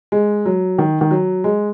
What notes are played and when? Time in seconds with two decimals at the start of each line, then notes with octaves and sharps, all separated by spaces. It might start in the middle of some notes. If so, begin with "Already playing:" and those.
0.12 G#3
0.46 F#3
0.78 D#3
1.01 D#3
1.11 F#3
1.44 G#3